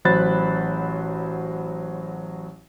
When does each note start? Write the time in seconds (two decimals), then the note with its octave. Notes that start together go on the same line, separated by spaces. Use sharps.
0.05 A1 F#3 C5 B5 F#6 A6